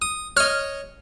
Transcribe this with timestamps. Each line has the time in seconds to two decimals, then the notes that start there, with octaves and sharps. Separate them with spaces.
0.02 D#6
0.37 C#5 D#5 F6